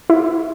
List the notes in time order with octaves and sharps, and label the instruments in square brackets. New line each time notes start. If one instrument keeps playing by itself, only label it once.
[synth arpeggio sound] E4